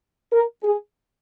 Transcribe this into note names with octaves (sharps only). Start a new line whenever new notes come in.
A#4
G#4